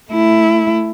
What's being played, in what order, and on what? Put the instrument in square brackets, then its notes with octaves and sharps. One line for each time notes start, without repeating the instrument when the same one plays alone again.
[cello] A3 E4